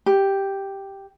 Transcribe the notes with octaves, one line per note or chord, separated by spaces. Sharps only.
G4